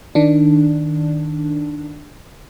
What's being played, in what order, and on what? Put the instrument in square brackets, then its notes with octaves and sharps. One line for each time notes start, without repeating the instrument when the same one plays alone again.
[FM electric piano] D#3 D4